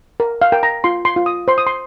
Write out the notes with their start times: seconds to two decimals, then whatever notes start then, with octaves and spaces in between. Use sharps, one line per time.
0.20 A#4
0.42 F5
0.52 A#4 G5
0.63 A#5
0.84 F4 C6
1.05 C6
1.16 F4
1.26 D#6
1.48 C5 C6
1.58 D#6
1.67 C6